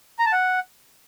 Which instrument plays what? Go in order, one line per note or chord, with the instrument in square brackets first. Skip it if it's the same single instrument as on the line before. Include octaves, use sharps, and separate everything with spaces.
[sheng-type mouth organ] A#5
A5
F#5